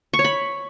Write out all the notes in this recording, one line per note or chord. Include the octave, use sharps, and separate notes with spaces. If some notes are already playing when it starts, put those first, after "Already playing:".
C#6
C#5
B5